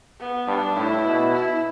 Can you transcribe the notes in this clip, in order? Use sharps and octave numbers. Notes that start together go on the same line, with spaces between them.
B3
G2 D4
A2 E4
B2
E4